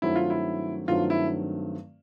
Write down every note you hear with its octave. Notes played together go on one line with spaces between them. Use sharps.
G2 D#3 F#3 A3 C4 E4
F4
E4
G2 D#3 F#3 A3 C4 F4
E4